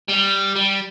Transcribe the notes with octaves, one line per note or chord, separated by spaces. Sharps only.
G3
G3